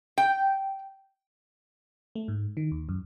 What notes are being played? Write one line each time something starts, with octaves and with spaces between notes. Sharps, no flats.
G5
A3
G#2
D#3
D#2
F#2